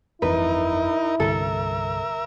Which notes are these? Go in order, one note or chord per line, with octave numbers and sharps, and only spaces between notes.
G1 F2 E3 D#4 E4 A#4 B4
C2 G2 D3 A4 A#4 E5